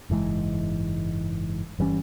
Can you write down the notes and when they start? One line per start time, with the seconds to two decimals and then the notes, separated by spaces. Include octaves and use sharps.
0.10 F#1 G#2 E3 G#3
1.79 G1 E3 G3 C#4